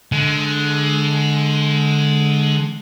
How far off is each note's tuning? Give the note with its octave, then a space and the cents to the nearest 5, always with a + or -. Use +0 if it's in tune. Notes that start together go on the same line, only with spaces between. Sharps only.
D3 +0 G#3 +20